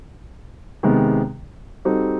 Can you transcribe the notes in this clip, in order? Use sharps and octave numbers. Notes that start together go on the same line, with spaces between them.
C3 D#3 G#3 B3
G3 C4 D#4 F#4 A4